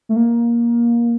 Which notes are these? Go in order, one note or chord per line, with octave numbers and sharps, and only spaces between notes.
A3
A#3